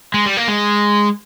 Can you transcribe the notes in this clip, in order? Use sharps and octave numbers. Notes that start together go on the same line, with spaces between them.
G#3
G3
A#3
G#3